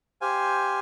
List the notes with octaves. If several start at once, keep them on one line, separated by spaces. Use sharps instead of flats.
G4 C5 F5 G#5